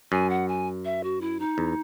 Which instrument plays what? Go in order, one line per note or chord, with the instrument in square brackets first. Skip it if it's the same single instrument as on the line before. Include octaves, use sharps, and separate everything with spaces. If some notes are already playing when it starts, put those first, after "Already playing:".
[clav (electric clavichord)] F#2 [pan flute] G#5
[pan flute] F#5
G#5
E5
F#4
E4
D#4
[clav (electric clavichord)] E2